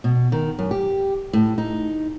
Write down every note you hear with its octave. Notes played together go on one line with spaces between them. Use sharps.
B2
D#3
F#2
G4
A2
D#4